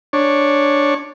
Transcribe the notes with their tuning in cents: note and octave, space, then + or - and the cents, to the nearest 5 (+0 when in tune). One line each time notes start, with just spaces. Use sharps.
D4 +0 C#5 -5